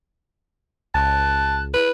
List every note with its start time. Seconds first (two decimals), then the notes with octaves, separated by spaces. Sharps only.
0.94 C#2 A5 F#6
1.74 E4 B4